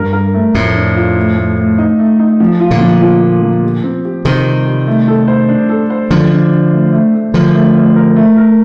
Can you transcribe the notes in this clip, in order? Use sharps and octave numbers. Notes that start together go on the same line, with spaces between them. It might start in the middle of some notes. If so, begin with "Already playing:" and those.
Already playing: G2 A#4
A#4
A3
F2 A2 A3
D4
F4
A3
A3
A3
D#4
A3
D#4
F3
F4
A#2 D3
F3
F4
A#3
F3
G4
C4
G4
C3 D#3 C5
G3
G3
A3
A4
C5
D4
A4
C5
D3 F3 D4
D4
D4
A3
A3
A3
D3 F3 A#4
A3
A3
A#4
A3
A#4